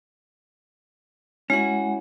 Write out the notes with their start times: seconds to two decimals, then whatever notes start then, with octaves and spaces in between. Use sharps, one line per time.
1.50 G#3 C#4 E4 F#4 F#5